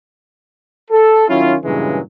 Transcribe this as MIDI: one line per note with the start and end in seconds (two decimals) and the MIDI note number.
0.91 1.26 69
1.29 1.57 51
1.29 1.57 54
1.29 1.57 61
1.29 1.57 64
1.29 1.57 65
1.64 2.00 43
1.64 2.00 46
1.64 2.00 49
1.64 2.00 52
1.64 2.00 54
1.64 2.00 56